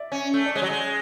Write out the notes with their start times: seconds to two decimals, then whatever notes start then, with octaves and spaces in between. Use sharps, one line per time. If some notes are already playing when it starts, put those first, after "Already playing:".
Already playing: D5 E5
0.12 C#4
0.34 A3
0.46 D5
0.55 G#3 C#5
0.62 F#3
0.70 G#3